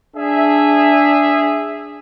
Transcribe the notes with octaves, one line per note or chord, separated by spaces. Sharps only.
D4 G#4 E5